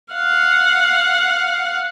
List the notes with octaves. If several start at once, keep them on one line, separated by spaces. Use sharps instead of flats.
F5 F#5